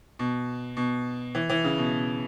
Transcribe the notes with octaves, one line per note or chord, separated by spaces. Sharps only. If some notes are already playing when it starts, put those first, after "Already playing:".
B2
B2
E3
E3
C#3
B2
B2